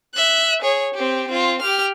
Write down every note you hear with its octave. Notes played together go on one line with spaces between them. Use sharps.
E5 F#6
G#4 C#5
C4 G4
C4 F4
G4 F6